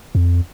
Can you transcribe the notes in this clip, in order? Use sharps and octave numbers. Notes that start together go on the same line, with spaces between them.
F2